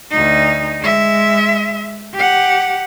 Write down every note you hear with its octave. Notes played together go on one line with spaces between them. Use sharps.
D2 D#4
G#3 E5
G4 F#5